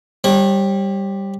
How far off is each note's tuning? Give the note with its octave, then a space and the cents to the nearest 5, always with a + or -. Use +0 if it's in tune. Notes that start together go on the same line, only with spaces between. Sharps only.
G3 +0 C#5 -40